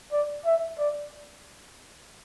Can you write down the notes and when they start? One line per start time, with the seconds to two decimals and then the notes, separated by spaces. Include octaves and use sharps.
0.12 D5
0.45 E5
0.79 D5